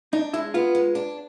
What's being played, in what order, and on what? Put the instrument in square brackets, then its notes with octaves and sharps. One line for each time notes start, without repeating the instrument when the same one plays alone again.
[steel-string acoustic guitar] D4 [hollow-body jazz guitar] D#4
[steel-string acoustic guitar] G#3 [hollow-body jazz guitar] E4
[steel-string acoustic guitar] B3 [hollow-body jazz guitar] F4
[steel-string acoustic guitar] G#3
D4